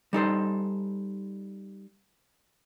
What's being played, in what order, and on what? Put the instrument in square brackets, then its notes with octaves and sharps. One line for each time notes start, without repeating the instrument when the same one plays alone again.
[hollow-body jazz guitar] G3 D#4 A4 C5